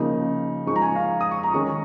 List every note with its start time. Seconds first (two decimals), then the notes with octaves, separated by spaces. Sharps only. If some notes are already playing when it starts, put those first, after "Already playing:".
Already playing: C#3 F3 A#3 D#4
0.66 F3 G#3 D#4 C#6
0.76 A#5
0.82 G#5
0.96 F5
1.21 D#6
1.31 C#6
1.43 A#5
1.54 D#3 G#3 C#4 C#6